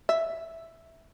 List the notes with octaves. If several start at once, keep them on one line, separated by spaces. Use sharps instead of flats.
E5